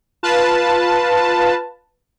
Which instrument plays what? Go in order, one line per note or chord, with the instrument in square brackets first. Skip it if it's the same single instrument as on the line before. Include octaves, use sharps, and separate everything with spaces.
[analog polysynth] F4 B4 A5